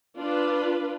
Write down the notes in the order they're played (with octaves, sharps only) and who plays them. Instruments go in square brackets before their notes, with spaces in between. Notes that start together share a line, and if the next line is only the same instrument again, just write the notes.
[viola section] D4 F4 B4